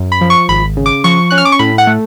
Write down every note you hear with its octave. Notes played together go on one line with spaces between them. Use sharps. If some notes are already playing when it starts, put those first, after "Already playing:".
Already playing: F#2
B5
F3
C#6
G#1 B5
C#3
D6
F3 C#6
C#4 F#6
F6
D6
C#6
A2 B5
F#5
A3